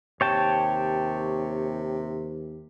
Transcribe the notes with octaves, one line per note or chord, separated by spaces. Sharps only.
D#2 C3 C#5 G5 A5